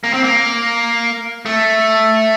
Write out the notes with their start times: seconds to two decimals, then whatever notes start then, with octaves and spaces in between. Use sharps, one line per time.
0.04 A#3
0.14 C4
0.24 A#3
1.46 A3